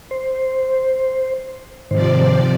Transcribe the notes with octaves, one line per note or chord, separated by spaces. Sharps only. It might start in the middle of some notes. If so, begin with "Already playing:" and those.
C5
G#2 C3 D#3 F3 C5 D5